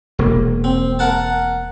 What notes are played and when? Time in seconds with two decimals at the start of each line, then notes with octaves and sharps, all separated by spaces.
0.19 E1 A#3
0.64 C4
0.99 A#4 F#5 A5